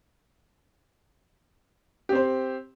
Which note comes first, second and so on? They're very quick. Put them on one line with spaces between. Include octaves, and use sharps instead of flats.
G4 C4 C5